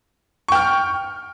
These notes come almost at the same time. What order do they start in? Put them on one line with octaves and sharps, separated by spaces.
C#6 G5 F6